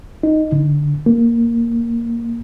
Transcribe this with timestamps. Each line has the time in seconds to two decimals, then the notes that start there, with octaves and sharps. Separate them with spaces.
0.23 D#4
0.52 D3
1.06 A#3